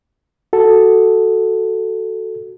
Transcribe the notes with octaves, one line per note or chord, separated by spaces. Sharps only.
F#4 A4